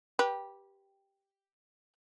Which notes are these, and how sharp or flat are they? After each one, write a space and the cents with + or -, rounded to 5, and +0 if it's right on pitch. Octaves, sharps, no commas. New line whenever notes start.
G4 +0 B4 -30